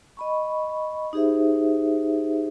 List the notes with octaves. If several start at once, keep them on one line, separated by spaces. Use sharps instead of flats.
D#5 B5 C#6
D#4 G4 G#4 C5 E5